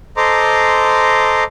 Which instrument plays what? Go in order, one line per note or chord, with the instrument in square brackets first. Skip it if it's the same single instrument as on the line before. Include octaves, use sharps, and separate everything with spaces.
[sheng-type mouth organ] A4 C5 D#5 A#5 C6 D6